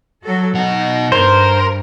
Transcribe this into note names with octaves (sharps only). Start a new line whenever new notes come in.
F#3 F#4 A4
B2 D#4 F#5
G2 A#4 C5